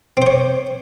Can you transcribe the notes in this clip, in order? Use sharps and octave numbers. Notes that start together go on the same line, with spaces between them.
C4 C5 C#5